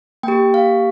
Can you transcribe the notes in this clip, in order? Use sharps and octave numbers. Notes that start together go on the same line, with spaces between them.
A#3 G4 G5
F5